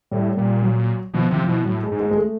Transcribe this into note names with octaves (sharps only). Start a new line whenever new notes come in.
A2 G3
A#2 G3
F#3
B2 F3
C3 F3
F3
B2 E3
A2 F#3
G#3
G#2
G#3
G#3
A3